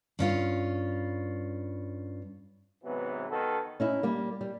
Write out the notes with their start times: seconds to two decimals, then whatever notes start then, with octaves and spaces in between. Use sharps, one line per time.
0.19 G2 C#4 F4
2.83 G#2 C3 E3 F#3 B3
3.29 D#3 B3 F#4 A4
3.80 C#4 D#4 E4
4.03 G3 A#3
4.41 G3